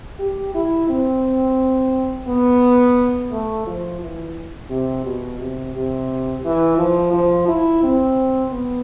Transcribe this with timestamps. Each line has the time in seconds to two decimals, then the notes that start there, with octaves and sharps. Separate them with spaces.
0.19 G4
0.55 E4
0.89 C4
2.28 B3
3.32 A3
3.66 F3
4.01 E3
4.70 C3
5.05 B2
5.39 C3
5.74 C3
6.44 E3
6.78 F3
7.13 F3
7.48 E4
7.83 C4
8.51 B3